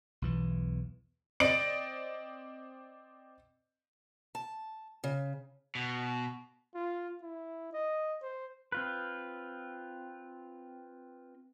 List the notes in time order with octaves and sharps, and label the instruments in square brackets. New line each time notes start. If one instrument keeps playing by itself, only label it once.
[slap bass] B1 E2 E3
[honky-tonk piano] C4 D5 D#5 D7 F#7
[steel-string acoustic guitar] A5
C#3
[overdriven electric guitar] B2
[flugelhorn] F4
E4
D#5
C5
[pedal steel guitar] C4 F4 B4